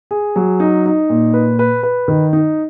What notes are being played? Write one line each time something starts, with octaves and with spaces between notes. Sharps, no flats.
G#4
F#3
D#4
D#4
A#2
B4
B4
B4
D#3
D#4